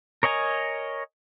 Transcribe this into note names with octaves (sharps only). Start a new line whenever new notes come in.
A#4 C#5 D#5 G#5 A#5